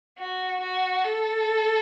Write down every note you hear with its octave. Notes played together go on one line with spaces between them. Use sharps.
F#4
F#4
A4